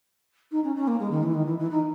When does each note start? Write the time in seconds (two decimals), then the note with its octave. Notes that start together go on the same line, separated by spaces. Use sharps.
0.51 D#4
0.63 C#4
0.75 C#4
0.87 A#3
0.99 G#3
1.10 D#3
1.22 E3
1.34 D#3
1.46 E3
1.58 E3
1.70 D#4